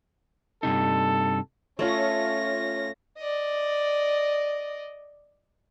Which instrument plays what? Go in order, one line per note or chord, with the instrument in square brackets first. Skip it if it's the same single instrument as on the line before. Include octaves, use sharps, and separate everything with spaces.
[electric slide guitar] G2 C3 D#4 [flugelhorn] A4
[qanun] A3 [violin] C#4 A#6 [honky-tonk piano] F4 C#5 C#6
[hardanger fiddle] D5 D#5